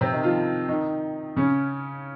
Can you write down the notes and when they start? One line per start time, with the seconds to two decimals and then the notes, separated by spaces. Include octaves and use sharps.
0.01 C3 C4
0.12 D#3 D#4
0.23 F3 F4
0.68 D#3 D#4
1.36 C#3 C#4